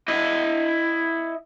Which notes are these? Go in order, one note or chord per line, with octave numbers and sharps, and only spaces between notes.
E4 D#5